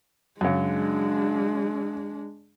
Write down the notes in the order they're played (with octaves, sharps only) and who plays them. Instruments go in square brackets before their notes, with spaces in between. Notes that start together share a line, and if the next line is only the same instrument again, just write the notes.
[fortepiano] F#2 C#3 [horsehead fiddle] G#3 D4